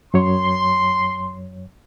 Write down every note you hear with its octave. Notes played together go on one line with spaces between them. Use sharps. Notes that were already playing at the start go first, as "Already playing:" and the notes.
F#2 F#3 C#5 C6